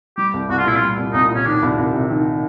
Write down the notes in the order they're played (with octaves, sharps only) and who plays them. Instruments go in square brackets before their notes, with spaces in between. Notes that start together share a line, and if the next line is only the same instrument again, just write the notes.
[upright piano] G3 [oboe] G4
[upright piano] C2
[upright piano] C2 [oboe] F#4
[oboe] F4
[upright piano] A#2 [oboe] E4
[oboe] F4
[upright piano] G3
C2
[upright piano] C2 [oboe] D#4
[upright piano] A#2
[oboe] C#4
[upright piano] D#3 [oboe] D4
[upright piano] C2
C2
C3
D#3